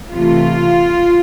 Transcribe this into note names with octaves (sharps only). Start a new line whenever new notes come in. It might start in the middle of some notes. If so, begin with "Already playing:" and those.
C3 E3 A3 F4